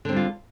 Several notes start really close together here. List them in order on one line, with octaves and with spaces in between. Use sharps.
D3 C4 G3 F4